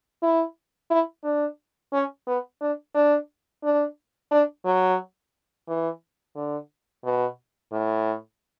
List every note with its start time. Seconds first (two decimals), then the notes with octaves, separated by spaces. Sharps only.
0.22 E4
0.90 E4
1.24 D4
1.92 C#4
2.27 B3
2.61 D4
2.94 D4
3.63 D4
4.31 D4
4.65 F#3
5.68 E3
6.36 D3
7.05 B2
7.72 A2